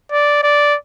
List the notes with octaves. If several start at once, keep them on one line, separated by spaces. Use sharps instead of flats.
D5
D5